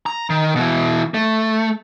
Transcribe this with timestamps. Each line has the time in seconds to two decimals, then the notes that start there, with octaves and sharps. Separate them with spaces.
0.06 A#5
0.30 D#3
0.56 B2 E3
1.14 A3